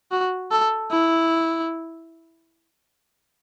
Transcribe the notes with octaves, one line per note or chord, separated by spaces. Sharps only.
F#4
A4
E4